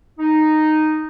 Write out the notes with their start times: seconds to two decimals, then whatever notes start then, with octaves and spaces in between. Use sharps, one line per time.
0.19 D#4